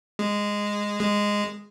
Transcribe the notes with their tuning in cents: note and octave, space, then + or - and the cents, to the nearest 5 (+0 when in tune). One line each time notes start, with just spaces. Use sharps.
G#3 -10
G#3 -10